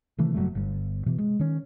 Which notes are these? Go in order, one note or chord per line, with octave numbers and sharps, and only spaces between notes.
C3 D#3 E3 A3
F#1 F#3 G3 A3
G1
B2 E3
G#3
D#3 C#4